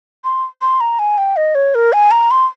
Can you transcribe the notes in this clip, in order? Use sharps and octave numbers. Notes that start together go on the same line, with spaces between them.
C6
C6
A#5
G#5
G5
D#5
C#5
A#4
G#5
A#5
C6